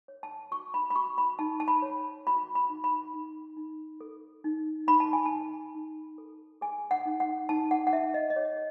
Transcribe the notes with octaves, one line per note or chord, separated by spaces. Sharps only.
C#5
A5
F#4 C#6
B5
B5
F#4 C#6
B5
D#4 A5
A5
B5
C#5
F#4 B5
B5
D#4
B5
D#4
D#4
A4
D#4
D#4 B5
A5
G#5
A5
D#4
D#4
A4
G#4 G#5
F#5
D#4
F#5
D#4 A5
F#5
F#5
D#4 E5
D#5
D#5
G#4 C#5